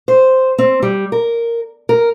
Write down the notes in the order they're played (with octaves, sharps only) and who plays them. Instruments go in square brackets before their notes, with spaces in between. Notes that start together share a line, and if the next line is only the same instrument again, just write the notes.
[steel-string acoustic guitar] C5
C4
G3
A#4
A#4